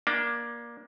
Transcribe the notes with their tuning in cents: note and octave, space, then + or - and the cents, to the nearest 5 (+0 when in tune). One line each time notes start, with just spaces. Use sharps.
A#3 +20 D4 +0